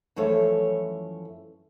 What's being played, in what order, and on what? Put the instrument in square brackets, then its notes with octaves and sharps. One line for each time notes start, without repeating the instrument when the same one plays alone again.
[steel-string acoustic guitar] F#2 E3 F3 A3 C#5